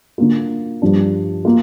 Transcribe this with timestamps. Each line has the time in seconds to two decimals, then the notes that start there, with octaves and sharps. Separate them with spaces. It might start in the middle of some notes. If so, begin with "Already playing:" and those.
0.18 D3 A#3 F4
0.82 G2 F3 D4
1.45 A#3 F4